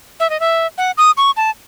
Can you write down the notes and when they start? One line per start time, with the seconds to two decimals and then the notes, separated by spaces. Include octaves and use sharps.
0.20 E5
0.30 D#5
0.40 E5
0.78 F#5
0.98 D#6
1.17 C#6
1.37 A5